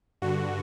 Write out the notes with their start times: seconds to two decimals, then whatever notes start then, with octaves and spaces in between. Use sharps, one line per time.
0.22 G2 D3 F#4